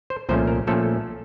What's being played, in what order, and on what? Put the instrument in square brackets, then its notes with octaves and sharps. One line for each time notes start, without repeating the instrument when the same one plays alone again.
[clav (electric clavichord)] C5
C2 A#2 F3 A3 C#4 C5
A#4
A#2 F3 A3 C#4 A4